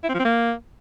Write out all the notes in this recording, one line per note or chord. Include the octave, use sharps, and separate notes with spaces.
E4
C4
F3
C4
A#3